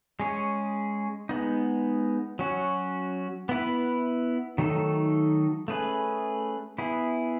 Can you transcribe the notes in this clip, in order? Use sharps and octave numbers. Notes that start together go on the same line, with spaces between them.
G#3 C#4 G#4 C#5
G#3 B3 D#4
F#3 C#4 F#4
B3 E4 B4
D#3 F#3 A3 D#4 A4
A3 C#4 G#4 B4
B3 E4 G#4